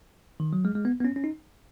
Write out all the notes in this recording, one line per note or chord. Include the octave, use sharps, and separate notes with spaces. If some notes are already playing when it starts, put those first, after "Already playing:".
D#3
F#3
G#3
G#3
B3
B3
C#4
C#4
D#4